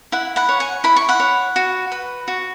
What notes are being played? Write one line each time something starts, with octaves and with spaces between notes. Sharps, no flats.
E4 F#5
F#5 B5
C#5
G#5 C#6
E4 B5
C#6
F#5 B5
C#5
F#4
B4
F#4